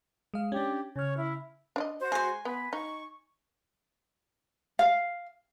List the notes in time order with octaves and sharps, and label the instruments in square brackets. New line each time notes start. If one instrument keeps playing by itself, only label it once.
[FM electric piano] G#3 F5
[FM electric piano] C#4 D4 [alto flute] G4
[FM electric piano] C#3 F6 [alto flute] C#5
[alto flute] E4
[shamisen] D4 D5 D#5
[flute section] F#4 C5
[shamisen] G#3 [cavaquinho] G#5 C6
[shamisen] B3 [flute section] B4
[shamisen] D#4 [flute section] C#6
[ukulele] F5